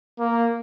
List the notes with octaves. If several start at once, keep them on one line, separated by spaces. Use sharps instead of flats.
A#3